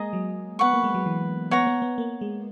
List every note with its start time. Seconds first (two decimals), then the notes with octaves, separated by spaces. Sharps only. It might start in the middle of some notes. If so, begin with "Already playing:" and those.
Already playing: G#3 A#3 G#4 D#5 A#5
0.13 F#3
0.59 B3 B4 F#5 C#6
0.73 A#3
0.84 G#3
0.94 F#3
1.06 E3
1.51 B3 C#5 F#5 A#5
1.67 B3
1.82 B3
1.98 A#3
2.21 G#3